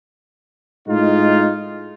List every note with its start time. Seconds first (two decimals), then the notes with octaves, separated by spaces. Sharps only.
0.87 A2 G#3 D#4 F4